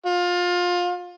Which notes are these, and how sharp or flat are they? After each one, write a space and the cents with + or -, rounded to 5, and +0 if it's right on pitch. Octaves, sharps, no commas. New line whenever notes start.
F4 +25